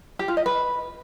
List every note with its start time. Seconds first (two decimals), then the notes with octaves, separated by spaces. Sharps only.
0.19 G4
0.28 F4
0.37 D#5
0.46 B4